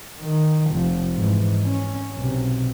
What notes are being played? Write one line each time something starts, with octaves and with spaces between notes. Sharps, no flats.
D#3
F1 F3
G#2 E3
C#4
B1 C3